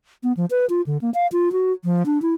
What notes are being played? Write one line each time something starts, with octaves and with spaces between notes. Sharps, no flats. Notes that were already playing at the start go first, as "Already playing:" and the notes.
B3
F3
B4
F4
D3
A#3
F5
F4
F#4
F3
D4
E4